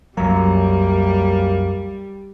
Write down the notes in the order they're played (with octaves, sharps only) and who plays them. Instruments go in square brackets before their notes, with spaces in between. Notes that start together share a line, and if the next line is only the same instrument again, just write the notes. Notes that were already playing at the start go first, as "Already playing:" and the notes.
[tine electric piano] C2 A#5 [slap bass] F#2 F#3 [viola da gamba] G3 [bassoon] A#3